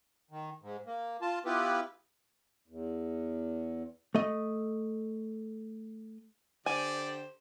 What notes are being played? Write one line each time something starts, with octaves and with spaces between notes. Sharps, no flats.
D#3
G#2
A#3
F4 A5
B3 E4 F4 G4 B4
E2
A3 D#5
D3 G4 C5 D5 G#5